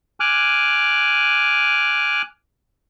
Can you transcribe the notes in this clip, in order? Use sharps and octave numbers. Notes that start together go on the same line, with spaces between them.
G#5 D6 F6 F#6